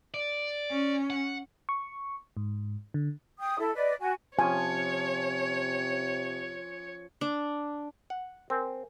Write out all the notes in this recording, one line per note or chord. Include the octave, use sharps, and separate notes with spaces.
D5
C#4
F#5
C#6
G#2
D3
G5 D#6
E4 A4
B4 D5 D#5
F#4 G#5
C3 F3 C#4 C#5 G5 G#5
D4
F#5
C4 A#4 G#5